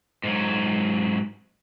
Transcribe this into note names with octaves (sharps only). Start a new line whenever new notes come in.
G#2 F#3